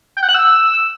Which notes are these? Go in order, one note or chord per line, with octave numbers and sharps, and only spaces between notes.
G5
F#5
F#6
E6